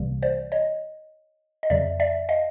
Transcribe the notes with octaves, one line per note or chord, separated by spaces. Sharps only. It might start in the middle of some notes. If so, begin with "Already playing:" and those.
Already playing: C2 C3 E3 G3 A#3
C5 D5
C#5 D#5
D#5
F2 C#3 F#3 D5 E5
D5 E5
D#5 F5